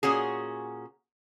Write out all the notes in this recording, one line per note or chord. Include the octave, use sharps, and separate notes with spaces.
A#2 C#4 F#4 G#4